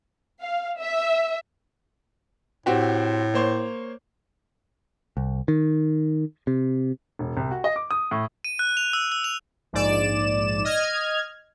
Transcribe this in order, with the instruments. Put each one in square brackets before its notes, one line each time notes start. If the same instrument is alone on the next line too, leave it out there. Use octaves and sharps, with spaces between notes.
[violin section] F5
E5
[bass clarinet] A2 [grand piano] C4 F#4 G4
[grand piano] A#3 C5 C#5
[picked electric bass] C2
D#3
C3
[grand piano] E1
C2
F#4
D#5
D6
D#6
A2
[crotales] D#7
F#6
F7
E6
E6
F7
[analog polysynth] A#1 G#2 D5 E7
D#5 F6 G#6